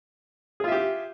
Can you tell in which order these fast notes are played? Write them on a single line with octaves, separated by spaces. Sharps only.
G#4 F4 E5 G4